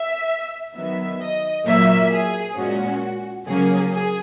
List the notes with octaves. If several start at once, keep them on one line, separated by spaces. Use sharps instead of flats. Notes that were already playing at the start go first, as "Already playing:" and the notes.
Already playing: E5
D#3 F#3 B3 E5
D#5
A#2 F#3 A#3 E5
G#4
A#2 G#3 C#4 F#4
C#3 F#3 A#3 C#4 G#4
G#4